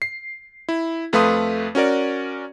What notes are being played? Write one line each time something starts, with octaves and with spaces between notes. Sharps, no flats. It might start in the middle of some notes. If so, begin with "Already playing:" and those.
C7
E4
F2 A3 B4 F5 C6 D#6
C#4 F#4 A#4 D5